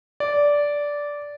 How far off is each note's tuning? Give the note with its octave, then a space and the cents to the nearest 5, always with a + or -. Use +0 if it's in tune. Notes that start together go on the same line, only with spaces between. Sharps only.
D5 -10